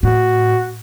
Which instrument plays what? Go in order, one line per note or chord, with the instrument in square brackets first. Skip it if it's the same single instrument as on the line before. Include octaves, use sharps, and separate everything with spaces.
[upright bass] A2 [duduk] F#4